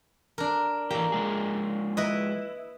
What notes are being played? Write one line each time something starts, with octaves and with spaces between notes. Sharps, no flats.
D4 A#4
E3 A#3 G4
F3 G#3 G#4
E4 B4 D#5